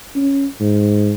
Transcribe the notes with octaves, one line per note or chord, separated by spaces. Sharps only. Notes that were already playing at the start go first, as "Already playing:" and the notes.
C#4
G#2